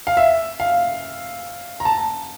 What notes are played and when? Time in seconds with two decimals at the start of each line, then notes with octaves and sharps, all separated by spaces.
0.07 F5
0.17 E5
0.60 F5
1.80 A#5
1.85 A5